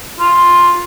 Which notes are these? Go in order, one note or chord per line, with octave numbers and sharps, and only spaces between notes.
F4